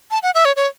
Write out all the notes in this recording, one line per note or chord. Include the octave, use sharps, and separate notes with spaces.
A5
F#5
E5
C#5
C#5